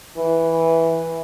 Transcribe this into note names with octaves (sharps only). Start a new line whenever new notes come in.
E3